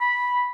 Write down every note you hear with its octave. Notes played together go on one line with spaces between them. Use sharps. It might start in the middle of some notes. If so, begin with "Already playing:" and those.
B5